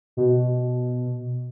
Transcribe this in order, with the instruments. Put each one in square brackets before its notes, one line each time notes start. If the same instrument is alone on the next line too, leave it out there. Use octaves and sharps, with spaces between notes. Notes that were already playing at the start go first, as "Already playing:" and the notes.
[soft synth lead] B2